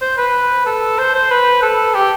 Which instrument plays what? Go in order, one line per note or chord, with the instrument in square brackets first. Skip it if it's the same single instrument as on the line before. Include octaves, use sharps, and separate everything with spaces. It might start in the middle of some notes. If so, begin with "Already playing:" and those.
[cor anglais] C5
B4
A4
C5
C5
B4
A4
G4